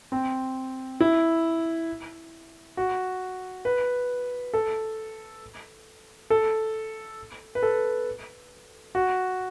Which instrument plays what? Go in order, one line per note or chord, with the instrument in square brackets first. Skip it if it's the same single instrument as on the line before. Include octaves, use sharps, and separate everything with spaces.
[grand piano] C4
E4
F#4
B4
A4
A4
B4
A4
F#4